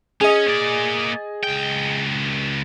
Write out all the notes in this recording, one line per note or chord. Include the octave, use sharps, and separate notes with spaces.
C#4 G#4 D#5
A#3 D5
C#2 G5